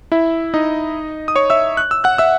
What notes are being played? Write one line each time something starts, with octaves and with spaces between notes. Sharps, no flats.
E4 E5
D#4 D#5
D#6
C#5 C#6
E5 E6
F#6
E6
F#5 F#6
E5 E6